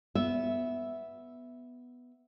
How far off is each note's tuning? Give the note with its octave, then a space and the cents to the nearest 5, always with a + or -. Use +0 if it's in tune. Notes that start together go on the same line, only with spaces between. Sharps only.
B3 +0 E5 +0